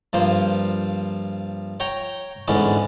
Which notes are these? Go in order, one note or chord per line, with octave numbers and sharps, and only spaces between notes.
G2 F3 A#3 C5
C#5 G5 A#5
E2 G#2 D3 B3 C#4